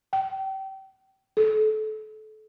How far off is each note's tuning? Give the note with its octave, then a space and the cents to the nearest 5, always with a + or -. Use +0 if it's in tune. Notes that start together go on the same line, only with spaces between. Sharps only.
G5 -30
A4 -25